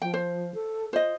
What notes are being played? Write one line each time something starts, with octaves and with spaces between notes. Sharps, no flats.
F3 G5
C5
A4
F4 C5 D#5